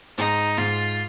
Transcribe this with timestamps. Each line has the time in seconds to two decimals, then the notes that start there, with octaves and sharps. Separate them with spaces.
0.18 G#2 D#4
0.58 G#2 F4